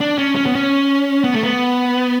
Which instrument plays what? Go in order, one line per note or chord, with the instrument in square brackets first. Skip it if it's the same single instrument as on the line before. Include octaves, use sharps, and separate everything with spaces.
[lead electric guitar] D4
C#4
C#4
B3
C#4
B3
A3
B3